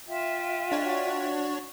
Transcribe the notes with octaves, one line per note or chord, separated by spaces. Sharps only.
F4 E5 G5
G#3 D4 C#5
F#4